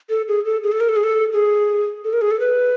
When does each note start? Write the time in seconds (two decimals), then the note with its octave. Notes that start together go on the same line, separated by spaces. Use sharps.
0.10 A4
0.28 G#4
0.45 A4
0.63 G#4
0.72 A4
0.80 A#4
0.89 A4
0.96 G#4
1.04 A4
1.33 G#4
2.04 A4
2.13 A#4
2.21 G#4
2.31 A4
2.40 B4